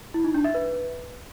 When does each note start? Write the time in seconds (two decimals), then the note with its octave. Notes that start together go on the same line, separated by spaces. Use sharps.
0.14 E4
0.24 D#4
0.34 D4
0.44 E5
0.54 B4